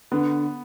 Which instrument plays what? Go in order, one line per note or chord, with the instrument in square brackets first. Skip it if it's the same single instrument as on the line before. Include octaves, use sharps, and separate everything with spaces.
[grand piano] D3 [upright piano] B3